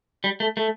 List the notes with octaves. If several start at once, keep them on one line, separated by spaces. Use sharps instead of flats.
G3
A3
A3